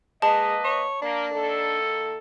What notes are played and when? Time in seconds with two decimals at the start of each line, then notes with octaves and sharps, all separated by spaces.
0.22 G#3 A#3 B4 D#5 A5
0.64 C#5
1.02 A#3 D4
1.32 D#3 A#3 A4